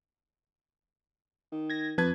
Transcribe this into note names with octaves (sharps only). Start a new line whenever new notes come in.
D#3
G#6 A#6
F2 B4 A5 G#6